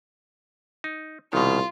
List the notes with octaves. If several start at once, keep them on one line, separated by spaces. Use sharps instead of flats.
D#4
C2 B2 D#3 F4